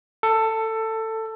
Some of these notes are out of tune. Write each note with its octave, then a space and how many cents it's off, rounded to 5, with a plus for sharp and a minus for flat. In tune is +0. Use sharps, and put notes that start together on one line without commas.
A4 +15